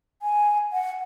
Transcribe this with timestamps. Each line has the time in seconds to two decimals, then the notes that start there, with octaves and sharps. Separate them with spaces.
0.22 G#5
0.73 F#5